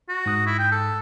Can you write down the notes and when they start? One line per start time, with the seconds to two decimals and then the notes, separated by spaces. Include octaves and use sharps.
0.09 F#4
0.26 G#2 D#6 F#6
0.46 E4
0.59 G5
0.72 A4